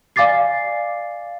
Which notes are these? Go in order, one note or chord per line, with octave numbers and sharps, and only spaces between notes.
D5 F5 G#5 D6 A6 C7